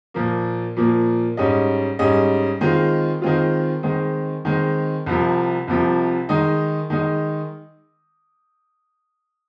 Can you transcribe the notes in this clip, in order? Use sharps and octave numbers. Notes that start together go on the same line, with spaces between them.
A#2 F3 A#3
A#2 F3 A#3
G#2 G3 C#4 G#4 D#5
G#2 G3 C#4 G#4 D#5
D#3 G#3 C4 F4
D#3 G#3 C4 F4
D#3 G#3 C4
D#3 G#3 C4
C2 C3 F3
C2 C3 F3
D#3 G#3 D#4
D#3 G#3 D#4